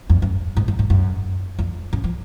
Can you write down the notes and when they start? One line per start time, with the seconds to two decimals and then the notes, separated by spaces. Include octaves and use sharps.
0.10 F2
0.22 F#2
0.57 G#2
0.68 F#2
0.79 G#2
0.90 F#2
1.59 F2
1.93 F#2
2.04 F3